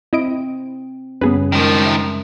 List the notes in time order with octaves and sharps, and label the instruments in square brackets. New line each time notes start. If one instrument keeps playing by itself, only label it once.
[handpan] C4 [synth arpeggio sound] E4 D#5 D7
[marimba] F#2 C#3 G3 [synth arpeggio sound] B3 G#4 B4 [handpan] C#4
[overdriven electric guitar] D#3 F3 [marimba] G#3 A#4
[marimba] E5 A#5